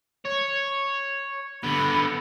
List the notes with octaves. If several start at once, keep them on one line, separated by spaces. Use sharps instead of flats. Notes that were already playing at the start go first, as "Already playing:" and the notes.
C#5
D3 B3 B5